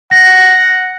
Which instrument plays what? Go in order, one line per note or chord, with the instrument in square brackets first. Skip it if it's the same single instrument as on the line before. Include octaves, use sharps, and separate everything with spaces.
[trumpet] F#5 [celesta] A#6